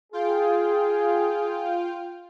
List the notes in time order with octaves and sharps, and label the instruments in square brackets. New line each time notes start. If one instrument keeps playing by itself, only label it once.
[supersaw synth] F4 G5 [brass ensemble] G#4